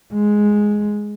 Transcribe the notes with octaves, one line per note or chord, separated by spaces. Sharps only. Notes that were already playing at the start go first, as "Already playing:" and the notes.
G#3